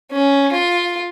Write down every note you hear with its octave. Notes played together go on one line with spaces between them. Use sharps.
C#4
F4